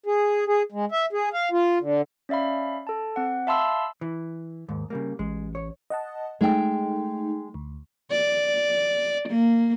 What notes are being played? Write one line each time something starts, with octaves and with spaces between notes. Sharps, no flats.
G#4
G#4
G#3
E5
G#4
F5
F4
D3
C#4 D5 E5 F5 B5
A4 A5
C4 F#5
E5 F5 A5 B5 C6 E6
E3
D#2 G#2
C#3 G3 A#3
A1 G#3
C#5
D#5 F#5 A5
G#3 A3 D#4 G5
D2
D5
A#3